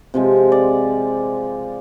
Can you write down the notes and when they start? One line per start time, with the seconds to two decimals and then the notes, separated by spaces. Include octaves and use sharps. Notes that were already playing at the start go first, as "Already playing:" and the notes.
0.14 C3 F3 G#3
0.52 D5